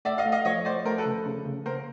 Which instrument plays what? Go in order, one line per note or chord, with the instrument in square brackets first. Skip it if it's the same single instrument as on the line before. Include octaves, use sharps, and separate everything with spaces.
[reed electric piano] A3 [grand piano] D5 E5
[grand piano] D#5 F5
[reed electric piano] A3
[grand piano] D#5 F5
[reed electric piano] F3 [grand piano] C#5 D#5
[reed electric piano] A3 [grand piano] C5 D5
[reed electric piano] A3 [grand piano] A#4 C5
[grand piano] A4 B4
[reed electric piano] C#3
C#3
C#3
[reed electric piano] A#3 [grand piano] A#4 C5